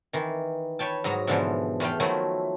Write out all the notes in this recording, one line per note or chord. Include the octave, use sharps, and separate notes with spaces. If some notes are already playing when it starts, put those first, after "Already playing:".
D#3 E3
B4 C#5 G5 A5
G#2 F#3 D#5 A#5
G#2 B2 D3 E3 F3
E2 A3 F5 G5
D#3 F3 F#3 A3 E4